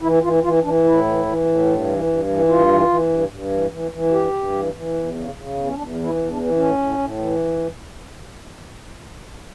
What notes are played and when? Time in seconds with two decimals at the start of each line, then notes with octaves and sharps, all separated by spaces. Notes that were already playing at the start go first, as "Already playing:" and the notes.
0.02 E3 E4
0.23 E3 F4
0.43 E3 F4
0.63 E3 D4
0.84 A2 E4
1.04 E3
1.25 E3
1.45 A2
1.65 G2
1.86 E3
2.06 G2
2.28 E3
2.48 G2 F4
2.68 E3
2.89 E3
3.09 G2
3.29 G2
3.51 E3
3.70 E3
3.91 E3
4.11 G2 G4
4.32 G2
4.52 E3
4.72 E3
4.94 E2
5.14 C#3
5.35 C#3
5.55 E2
5.66 C#4
5.75 E2 D4
5.95 E3
6.03 E4
6.16 E2
6.30 D4
6.36 E3
6.56 A2 C#4
6.78 A2
6.98 A2
7.18 E3